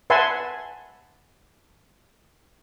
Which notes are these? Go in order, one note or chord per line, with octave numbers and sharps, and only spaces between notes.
B4 E5 F#5 G#5 A5 C6